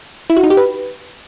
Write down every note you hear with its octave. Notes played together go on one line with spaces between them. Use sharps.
E4
F#4
D#4
G4
B4